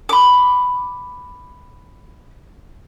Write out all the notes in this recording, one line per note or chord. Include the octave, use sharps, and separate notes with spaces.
B5 D6